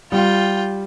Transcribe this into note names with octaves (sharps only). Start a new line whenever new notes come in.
G3 F4 G5